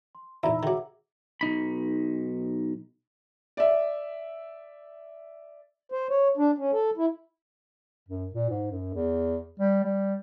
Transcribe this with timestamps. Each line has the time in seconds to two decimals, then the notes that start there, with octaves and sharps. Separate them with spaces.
0.15 C6
0.43 E2 A#2 D#4 C5 E5 A#5 B5
0.63 D#3 F#3 G#4 F#5 D6
1.41 B1 D#4 B5
3.57 D5 E5
5.92 C5
6.10 C#5
6.37 D4
6.58 C#4
6.73 A4
6.97 E4
8.09 F#2
8.34 A#2
8.50 G#2
8.71 F#2
8.94 E2
9.60 G3
9.84 G3